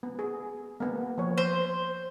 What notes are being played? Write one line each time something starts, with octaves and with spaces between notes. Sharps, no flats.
B3
G#4
A#3 B3
F3 C#5
C5